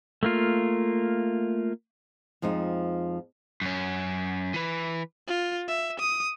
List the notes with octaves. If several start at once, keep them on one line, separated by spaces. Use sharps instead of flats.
A3 A#3 F4
F2 F3 G#3 D#4 F4
F#2 C#4
E3 B4
F4
E5
D#6